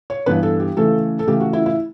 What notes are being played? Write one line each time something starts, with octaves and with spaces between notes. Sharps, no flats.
C#5
G2 E3 B3 D4 B4
A4
G4
C#3 E3 A3 A4
A4
C#3 E3 A3 G4
F#4
E4
E4